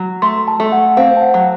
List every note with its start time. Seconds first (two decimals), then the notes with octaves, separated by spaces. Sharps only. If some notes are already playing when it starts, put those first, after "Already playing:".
Already playing: F#3
0.22 A3 C6
0.48 A5
0.60 A3
0.72 F#5
0.97 C4 F5
1.17 A5
1.22 F#5
1.34 F#3